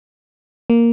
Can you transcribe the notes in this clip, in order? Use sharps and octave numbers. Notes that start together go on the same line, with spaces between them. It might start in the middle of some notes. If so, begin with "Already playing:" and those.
A#3